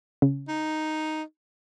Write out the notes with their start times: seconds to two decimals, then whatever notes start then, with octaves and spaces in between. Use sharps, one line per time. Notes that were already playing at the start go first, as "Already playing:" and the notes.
0.22 C#3
0.48 D#4